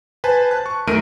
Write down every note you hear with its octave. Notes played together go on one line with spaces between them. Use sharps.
B4 C5 G#5 A5
A5 F#6
C#6
F#2 D#3 A3 A#4 D7 D#7